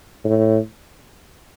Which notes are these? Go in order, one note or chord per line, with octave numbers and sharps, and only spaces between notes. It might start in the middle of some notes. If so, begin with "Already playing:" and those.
A2